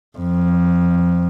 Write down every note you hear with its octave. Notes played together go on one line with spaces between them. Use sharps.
F2